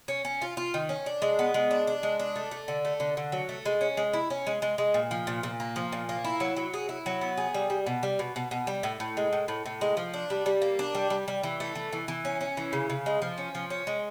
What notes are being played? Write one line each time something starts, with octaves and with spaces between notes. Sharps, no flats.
C#4
C#4
F4
F4
D#3
C#4
D4
G#3
B3
G#3
D4
D4
G#3
D4
A3
A3
D3
A3
D3
D3
F#3
A3
G#3
C#4
G#3
E4
C#4
G#3
G#3
G#3
A#2
F3
A#2
A#2
A#3
F3
A#2
A#3
E4
F#3
F#3
G#4
E4
F#3
B3
G#4
G3
G3
B2
G3
B2
B2
B2
G3
A2
A2
G#3
A2
A2
A2
G#3
F3
D4
G3
G3
A#3
D4
G3
G3
G3
E3
A3
E3
E3
E3
C#4
C#4
E3
C#3
C#3
G#3
F3
C#4
F3
C#4
G#3